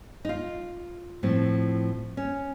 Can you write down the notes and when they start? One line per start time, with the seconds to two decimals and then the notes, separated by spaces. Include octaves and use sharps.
0.25 D#4
0.29 F4
1.23 A2 F3 C4
2.17 C#4